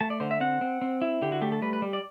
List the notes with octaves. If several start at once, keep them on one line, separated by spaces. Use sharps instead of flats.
A3 A5
D5
D3 C5
E5
C4 F#5
C4
C4
E4
D3 G4
F#4
A3 G4
A4
G3 B4
B4
G3
D5